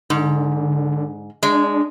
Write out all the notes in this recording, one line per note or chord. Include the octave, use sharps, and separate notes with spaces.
G#2 D3
G#3 D4